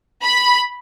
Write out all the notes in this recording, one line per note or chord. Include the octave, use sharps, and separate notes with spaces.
B5